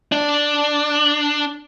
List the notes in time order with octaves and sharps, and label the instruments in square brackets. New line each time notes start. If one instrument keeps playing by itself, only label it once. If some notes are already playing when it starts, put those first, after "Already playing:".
[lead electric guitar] D4